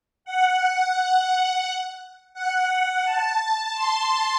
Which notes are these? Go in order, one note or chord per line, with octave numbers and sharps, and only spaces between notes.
F#5
F#5
A5
C6